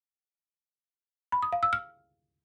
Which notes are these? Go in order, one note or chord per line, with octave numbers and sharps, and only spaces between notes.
B5
D#6
F5
E6
F6